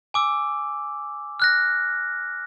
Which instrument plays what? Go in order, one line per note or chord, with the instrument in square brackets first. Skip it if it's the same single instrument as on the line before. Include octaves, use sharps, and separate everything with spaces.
[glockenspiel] G#5 D6 E6
F6 F#6 A#6